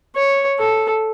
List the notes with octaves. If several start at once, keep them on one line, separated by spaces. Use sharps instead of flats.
C#5
A4